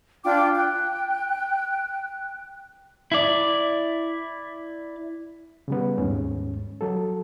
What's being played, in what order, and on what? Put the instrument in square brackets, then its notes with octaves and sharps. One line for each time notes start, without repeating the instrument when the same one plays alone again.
[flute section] D4 F4 G5 D6
G5 F#6
[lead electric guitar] E4 D5
[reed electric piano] C#3 G3 B3
D#2 G#2 C#4
F#3 A4